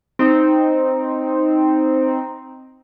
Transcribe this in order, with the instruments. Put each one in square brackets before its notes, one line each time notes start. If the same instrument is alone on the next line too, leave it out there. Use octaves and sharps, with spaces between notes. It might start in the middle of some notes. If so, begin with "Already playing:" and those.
[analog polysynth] C4 D#4